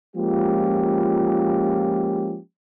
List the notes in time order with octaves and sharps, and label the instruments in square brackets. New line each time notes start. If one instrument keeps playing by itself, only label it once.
[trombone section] F3 G#3 A#3 C#4 F4 G4